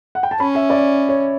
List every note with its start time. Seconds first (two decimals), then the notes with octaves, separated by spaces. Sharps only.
0.15 F#5
0.23 G5
0.31 A5
0.39 C#4 B5
0.55 E5
0.70 D5
1.09 C#5